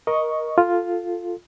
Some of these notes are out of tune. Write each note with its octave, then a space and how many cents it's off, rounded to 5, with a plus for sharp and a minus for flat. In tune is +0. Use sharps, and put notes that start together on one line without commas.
A#4 +20 D#5 +0 C#6 +0
F4 +0 A4 +0